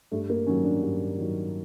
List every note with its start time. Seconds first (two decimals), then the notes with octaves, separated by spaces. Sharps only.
0.12 G2 A3
0.30 A#3
0.47 D#3 C#4
0.49 F#3
0.64 D4
0.83 G2
1.18 D#3 F#3